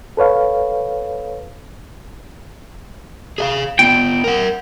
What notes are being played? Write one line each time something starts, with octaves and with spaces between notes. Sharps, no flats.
A4 B4 C#5 F5
G#4 E5 F5
B3 F4 G5
A#4 F#5